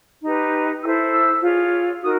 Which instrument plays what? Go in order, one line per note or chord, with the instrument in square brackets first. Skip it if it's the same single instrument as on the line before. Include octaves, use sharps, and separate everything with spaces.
[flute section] D#4 G4 B4
E4 A4 C5 E6
E6
F4 G#4 C#5
D#4 F#4 A#4 D#6